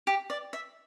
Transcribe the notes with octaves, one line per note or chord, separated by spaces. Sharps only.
G4
D5
E5